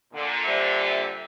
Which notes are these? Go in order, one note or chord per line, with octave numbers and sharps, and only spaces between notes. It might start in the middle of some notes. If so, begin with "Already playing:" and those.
A#2 D3
G3 C5 E5